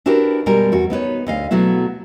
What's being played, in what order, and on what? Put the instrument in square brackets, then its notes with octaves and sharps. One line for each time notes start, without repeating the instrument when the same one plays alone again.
[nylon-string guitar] D4 E4 F#4 G4 A#4 B4
B2 G3 G#3 A#4
E2 F#4
B3 D#4 B4 C#5
D2 D#5 F5
B2 F#3 A3 B3 E4